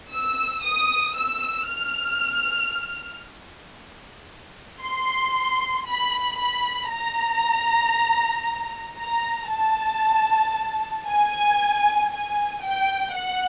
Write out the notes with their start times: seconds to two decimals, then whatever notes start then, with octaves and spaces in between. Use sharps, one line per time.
0.12 E6
0.65 D#6
1.16 E6
1.69 F6
4.82 C6
5.86 B5
6.38 B5
6.90 A#5
8.99 A#5
9.52 A5
11.08 G#5
12.12 G#5
12.64 G5
13.17 F#5